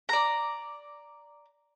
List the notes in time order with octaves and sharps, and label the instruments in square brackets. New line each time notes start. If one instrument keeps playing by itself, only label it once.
[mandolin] D5 A#5